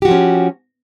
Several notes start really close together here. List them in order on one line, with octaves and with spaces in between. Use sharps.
G4 F#4 F3 C#4